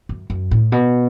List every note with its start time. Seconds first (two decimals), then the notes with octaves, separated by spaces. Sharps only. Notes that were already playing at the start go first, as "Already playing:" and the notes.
0.09 F#2
0.30 F#2
0.51 A2
0.72 B2